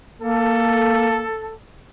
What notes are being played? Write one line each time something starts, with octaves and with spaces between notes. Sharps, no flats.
A#3 A4